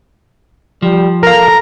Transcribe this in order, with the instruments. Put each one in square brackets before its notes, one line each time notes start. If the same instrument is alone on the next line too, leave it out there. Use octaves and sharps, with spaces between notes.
[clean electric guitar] F3 [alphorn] G3
[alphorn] A4 [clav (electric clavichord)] A#4 F5 [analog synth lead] A#5